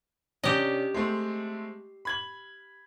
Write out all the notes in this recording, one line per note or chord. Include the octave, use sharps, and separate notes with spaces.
C3 C#4 D4 G4 D#5
G#3 A3 C4
B5 G#6 F#7